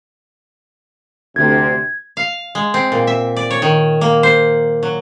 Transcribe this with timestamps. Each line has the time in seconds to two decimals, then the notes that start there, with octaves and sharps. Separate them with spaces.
1.36 D2 C3 G#6
2.17 F5
2.55 G#3
2.74 C4
2.92 A#2
3.07 E5
3.37 D5
3.51 C#5
3.62 D#3
4.01 A#3
4.23 C5
4.83 F#3